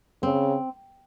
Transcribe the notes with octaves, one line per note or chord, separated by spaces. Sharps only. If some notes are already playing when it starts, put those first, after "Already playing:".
C#3 C4